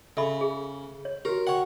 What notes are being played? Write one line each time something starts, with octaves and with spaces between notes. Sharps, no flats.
C#3 A4 E5 B5
G#4
C#5
F#4 G4 A#4
C#5 F#5 G5